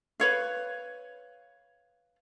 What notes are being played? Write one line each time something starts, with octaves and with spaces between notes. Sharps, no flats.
B4 C#5 F5